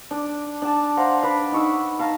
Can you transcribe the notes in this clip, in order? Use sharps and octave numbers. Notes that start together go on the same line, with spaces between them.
D4
D4 A5
C5 F5 F#5 A#5
D4 B4
D#4 C#6 E6
F5 A5 A#5